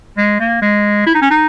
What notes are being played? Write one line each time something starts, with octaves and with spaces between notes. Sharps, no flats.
G#3
A#3
G#3
E4
D#4
C#4
D#4